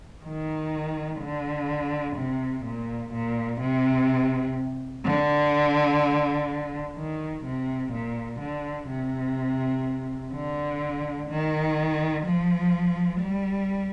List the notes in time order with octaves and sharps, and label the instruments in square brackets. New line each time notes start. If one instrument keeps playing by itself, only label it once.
[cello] D#3
D3
C3
A#2
A#2
C3
D3
D#3
C3
A#2
D3
C3
D3
D#3
F3
G3